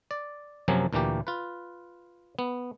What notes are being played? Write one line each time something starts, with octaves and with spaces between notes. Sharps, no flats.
D5
F#2 C3 F3 F#3 A#3 G#5
D2 A#2 E3 A#3 G4
F4 B4
B3